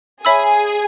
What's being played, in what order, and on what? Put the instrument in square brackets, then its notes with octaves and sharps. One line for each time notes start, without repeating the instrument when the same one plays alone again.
[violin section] G#4 G#5 [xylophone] C#5 E5 B5 E6